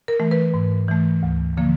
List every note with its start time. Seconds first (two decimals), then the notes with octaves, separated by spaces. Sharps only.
0.08 A#4
0.20 E3 A3
0.31 B4
0.54 G#2
0.88 E3 A3
1.23 D2
1.57 D3 F3 A#3